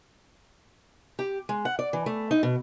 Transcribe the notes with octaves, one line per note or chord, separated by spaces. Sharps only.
G4
G#3
F#5
D5
E3
A3
D#4
B2